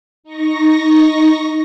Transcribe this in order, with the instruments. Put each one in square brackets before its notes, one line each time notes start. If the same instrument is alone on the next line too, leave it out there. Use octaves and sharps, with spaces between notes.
[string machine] D#4 C#6 A#6